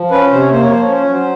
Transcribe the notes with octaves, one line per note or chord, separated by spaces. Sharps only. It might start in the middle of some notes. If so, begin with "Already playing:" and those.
Already playing: F3
C#4 B4
C3 C5
C#5
A#3 C5
C#5
F3 C5
C#5
C#4 C5
C#5
F#3 C5